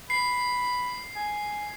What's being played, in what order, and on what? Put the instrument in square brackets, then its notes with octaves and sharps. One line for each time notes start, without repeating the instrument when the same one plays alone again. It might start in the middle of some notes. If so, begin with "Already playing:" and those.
[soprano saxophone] B5 [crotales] C7
[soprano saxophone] G#5